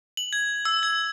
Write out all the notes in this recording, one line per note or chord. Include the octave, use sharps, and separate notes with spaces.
F#7
G#6
E6
G#6